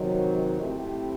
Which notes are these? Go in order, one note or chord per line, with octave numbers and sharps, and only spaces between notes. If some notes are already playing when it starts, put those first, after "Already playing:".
Already playing: C3 D#3 F#3
A3 C4 E4 G4